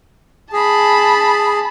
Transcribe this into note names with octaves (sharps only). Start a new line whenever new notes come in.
G#4 A5 B5